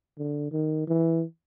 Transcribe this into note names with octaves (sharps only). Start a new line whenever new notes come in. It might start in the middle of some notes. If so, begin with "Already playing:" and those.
D3
D#3
E3